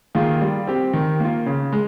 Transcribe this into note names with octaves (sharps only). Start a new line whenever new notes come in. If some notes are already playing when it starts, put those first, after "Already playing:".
D#3 A#3 F4 G#4
G3
C4 G4
D#3
A#3 F4
C#3
G#3